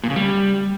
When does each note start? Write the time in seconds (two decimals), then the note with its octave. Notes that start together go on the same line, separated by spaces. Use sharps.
0.04 A#2
0.10 C#3
0.16 G3